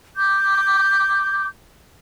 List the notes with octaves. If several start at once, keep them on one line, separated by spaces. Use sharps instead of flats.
D6 G6